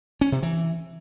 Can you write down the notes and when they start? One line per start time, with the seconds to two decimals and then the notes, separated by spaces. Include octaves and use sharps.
0.21 C#4
0.32 C3
0.43 E3